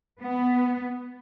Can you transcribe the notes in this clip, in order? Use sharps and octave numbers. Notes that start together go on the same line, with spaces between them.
B3